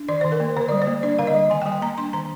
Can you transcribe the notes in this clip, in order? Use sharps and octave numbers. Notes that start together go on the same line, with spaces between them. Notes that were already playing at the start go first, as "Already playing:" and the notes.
Already playing: D4
D#3 D5
C5
D#3
A#4
A#3
D3 C5
G3 D5
C5
A#3
D4 D5
D3 F5
D#5
G3
D#3 G#5
G5
G3 G#5
A#3 A#5
D4 C6
D#3 A#5